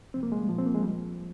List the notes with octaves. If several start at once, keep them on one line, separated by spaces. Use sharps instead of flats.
C3 F3 C4
A#3
G#3
G3
A#2 F3
C4
A#3
G#3
F3 G3